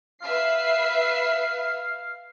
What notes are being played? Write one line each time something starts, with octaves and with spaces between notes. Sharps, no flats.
B4 E5 F5 C7